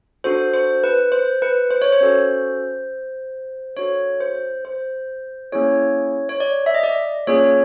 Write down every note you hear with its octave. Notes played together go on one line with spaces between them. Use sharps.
D4 F#4 A4 C5
C5
B4
C5
B4
C5
C#5
C5
C#4 F#4 A4
D4 F#4 A4 C#5
C5
C5
A#3 C#4 E4 G#4 C#5
C#5
D5
E5
D#5
D5
A#3 C#4 F4 G#4 C#5